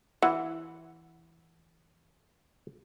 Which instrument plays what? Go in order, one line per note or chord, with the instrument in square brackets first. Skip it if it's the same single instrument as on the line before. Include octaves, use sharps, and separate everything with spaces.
[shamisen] E3 [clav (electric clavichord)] F#5